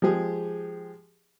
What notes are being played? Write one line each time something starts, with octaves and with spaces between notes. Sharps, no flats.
F3 G#3 G4 G#4